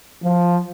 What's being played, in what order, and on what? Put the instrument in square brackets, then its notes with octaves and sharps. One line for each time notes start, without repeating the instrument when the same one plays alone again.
[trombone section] F3